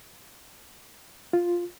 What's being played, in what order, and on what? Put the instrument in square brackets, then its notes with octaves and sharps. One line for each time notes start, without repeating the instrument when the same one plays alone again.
[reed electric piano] F4